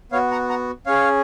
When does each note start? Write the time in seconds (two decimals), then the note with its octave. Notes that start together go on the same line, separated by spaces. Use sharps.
0.12 B3 F#4 C#5 F5
0.31 F#5 A#5
0.49 F#5 A#5
0.86 C#4 G#4 C#5 F5